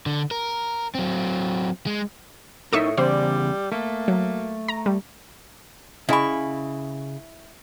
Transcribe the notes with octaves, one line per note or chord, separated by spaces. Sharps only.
D3
A#4
F#3 C4
G#3
A2 D#4 A4 A#4 E5 C#6 D#6
E2 C#3 G3 C5 D5
A3 A#3
F#3
A#5
G3
C#3 E4 D#5 G#5 B5 C#6